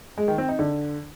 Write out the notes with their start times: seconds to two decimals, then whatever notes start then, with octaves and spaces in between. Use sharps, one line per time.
0.18 G#3
0.28 D#3
0.38 C4
0.49 D#4
0.59 D3